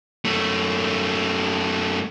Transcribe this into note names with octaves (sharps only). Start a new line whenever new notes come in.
F#2 A3